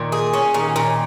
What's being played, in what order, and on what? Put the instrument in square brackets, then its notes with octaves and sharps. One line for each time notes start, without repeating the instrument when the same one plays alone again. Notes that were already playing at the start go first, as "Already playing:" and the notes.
Already playing: [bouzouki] A#2 [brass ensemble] D#3
[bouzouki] G#4
C#4
[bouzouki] A#2 [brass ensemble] D#3
[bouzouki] A#2